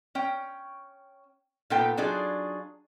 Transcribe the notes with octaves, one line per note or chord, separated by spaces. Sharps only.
C#4 G5
A#2 B3 D#4 A4 G5
F#3 D4 D#4 F4 G#4